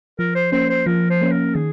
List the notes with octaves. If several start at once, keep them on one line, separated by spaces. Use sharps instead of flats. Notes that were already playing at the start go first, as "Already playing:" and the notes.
F3 A#4
C5
A#3 C#4 C5
C5
F3 A#4
C5
A#3 C#4
A#4
D#3 G#4